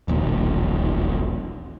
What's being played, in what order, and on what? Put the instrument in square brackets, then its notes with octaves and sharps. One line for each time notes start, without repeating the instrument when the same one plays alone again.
[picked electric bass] E1 A#1 D#2